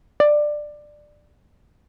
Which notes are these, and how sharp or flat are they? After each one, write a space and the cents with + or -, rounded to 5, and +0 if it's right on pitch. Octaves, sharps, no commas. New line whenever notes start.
D5 +15